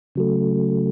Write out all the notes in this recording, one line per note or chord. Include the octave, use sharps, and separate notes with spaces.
C#3 F#3 A3